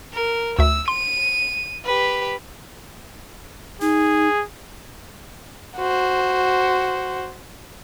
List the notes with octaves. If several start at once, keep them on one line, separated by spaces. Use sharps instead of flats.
A#4
D2 E5 E6
C6 D#7
G4 B4
D#4 G#4
F#4 C5